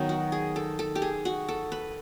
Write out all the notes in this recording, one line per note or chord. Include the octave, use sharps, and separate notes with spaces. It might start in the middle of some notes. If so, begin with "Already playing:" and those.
Already playing: D#3 F#3 B3 D#4
F#4
G#4
A4
A4
G4
G#4
F#4
A4
B4